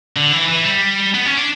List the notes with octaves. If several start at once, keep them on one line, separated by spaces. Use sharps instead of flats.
D3
E3
E3
G3
B3
C#4
D4